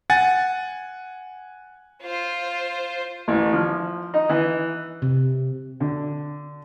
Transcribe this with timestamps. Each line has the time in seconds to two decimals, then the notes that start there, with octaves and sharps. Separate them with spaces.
0.10 F#5 G#5 A6
2.02 F4 C5
3.28 A1
3.53 F3
4.14 D#4
4.29 E3
5.02 C3
5.80 D3